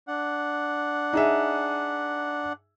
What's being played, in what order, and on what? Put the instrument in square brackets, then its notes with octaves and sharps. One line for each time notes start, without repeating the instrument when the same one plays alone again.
[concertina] D4 F#5
[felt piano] D#4 G#4 E5